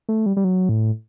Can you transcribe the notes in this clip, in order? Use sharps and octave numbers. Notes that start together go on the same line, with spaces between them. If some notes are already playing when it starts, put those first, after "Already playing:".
A3
G3
G3
F#3
A2